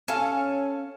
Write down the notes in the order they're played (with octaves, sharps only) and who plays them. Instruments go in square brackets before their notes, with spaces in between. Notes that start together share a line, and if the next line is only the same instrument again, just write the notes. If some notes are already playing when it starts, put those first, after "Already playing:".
[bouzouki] C#4 A4 F5